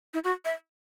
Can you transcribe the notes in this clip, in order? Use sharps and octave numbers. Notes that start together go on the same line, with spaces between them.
E4
F#4
E5